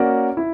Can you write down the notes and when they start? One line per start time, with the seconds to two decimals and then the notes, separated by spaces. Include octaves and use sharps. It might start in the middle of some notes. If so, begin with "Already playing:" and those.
Already playing: A#3 C#4 F#4 A#4 D5
0.37 E4